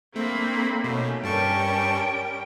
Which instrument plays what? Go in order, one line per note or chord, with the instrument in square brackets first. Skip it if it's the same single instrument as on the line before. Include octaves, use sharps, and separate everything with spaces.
[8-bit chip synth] A3 [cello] A#3 [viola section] C4 D4 B5
[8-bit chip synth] B2 [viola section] A3 C#4 D#4
[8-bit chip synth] G2 A5 C#6 [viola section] G3 C#4 A#4 [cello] G5